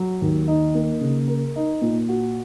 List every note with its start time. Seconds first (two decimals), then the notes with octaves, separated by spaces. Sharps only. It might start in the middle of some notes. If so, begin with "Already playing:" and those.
Already playing: F#3
0.21 D#2
0.48 D#4
0.75 A#3
1.01 C#3
1.28 A#4
1.56 D#4
1.82 A#2
2.09 F#4